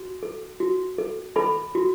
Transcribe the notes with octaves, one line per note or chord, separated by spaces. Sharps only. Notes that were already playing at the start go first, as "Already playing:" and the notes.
Already playing: F#4
A4
F#4
A4
A4 B5
F#4